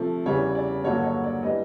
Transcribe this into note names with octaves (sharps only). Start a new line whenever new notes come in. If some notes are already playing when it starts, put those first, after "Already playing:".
Already playing: C3 F3 A3
E2 C#3 E3 G3 C#5
D5
G2 D3 F#3 A#3 C#5
C#5
D5
E3 G3 B3 D4 D#5